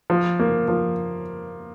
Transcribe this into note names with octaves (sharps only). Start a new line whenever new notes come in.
F3
A#3
F3